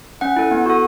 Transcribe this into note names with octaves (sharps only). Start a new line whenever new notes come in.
C#4 F#5
E4 A4
B3
F#4 A4